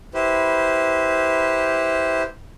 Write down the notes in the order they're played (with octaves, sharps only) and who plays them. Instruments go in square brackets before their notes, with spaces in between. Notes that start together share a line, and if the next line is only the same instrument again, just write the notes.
[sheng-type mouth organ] E4 G4 B4 C5